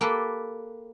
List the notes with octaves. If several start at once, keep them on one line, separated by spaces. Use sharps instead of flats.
A#3 G4 A4 B4